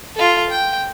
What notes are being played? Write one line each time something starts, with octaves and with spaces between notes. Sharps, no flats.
F4 A4
G5